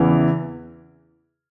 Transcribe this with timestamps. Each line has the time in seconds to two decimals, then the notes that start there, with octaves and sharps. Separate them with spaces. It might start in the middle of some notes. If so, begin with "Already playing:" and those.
Already playing: E2 C#3 E3